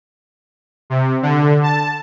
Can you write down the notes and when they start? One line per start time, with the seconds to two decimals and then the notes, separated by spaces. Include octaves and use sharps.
0.90 C3
1.22 D3
1.63 A5